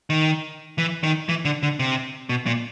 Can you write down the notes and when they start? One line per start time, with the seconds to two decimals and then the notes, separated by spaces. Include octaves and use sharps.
0.10 D#3
0.78 E3
1.03 D#3
1.29 E3
1.45 D3
1.63 D3
1.79 C3
2.29 B2
2.46 A#2